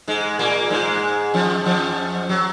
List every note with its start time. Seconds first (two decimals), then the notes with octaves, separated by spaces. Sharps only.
0.07 G#2 G#3
0.39 A#2 A#3
0.70 G#2 G#3
1.34 F2 F3
1.65 F2 F3
2.29 F#3